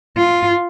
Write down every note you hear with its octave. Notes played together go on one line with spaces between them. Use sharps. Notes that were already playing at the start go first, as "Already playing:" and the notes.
F4